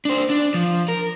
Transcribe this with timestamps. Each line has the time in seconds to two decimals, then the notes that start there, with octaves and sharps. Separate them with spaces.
0.05 D4 C5
0.30 D4
0.54 F3
0.88 A#4